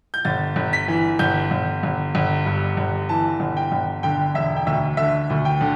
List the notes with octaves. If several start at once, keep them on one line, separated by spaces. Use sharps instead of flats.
G6
G1 A6
G1
B6
E3
G1 G6
G1
G1
G1
G2
G1
E3 A5
G1
G5
G1
D3 G5
E1 E5
G5
D2 E5
D3 E5
D2
G5
D3